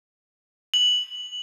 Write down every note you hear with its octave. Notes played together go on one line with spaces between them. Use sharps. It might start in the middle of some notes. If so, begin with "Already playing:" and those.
F#7